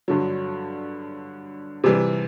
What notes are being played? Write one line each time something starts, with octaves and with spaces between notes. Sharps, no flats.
G2 D3 F#3
C3 E3 G3